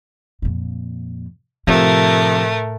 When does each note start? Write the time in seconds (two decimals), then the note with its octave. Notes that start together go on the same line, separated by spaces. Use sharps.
0.42 F2 A#2
1.67 A2 C3 F3 A3 A#4